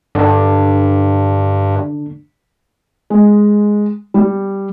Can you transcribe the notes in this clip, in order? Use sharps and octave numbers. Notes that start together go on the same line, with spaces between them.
G2 D3 D4
G#3
G3